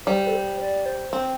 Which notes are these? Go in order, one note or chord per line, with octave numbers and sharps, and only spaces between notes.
G3 C5
A4
C5
D5
C5
C4 C5